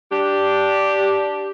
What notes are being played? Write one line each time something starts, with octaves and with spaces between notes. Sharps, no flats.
D4 G4